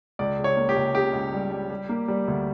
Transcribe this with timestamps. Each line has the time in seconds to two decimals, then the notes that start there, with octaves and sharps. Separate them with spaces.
0.19 C#2 D5
0.38 C#3
0.44 C#5
0.57 A#3
0.69 G4
0.76 C#2
0.95 C#3 G4
1.13 C#2
1.33 G3
1.51 G3
1.70 G3
1.89 A#3
2.08 G3
2.28 D2